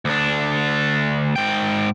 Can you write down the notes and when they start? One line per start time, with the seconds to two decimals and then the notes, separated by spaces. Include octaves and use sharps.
0.05 D2 D4
1.36 G#2 G5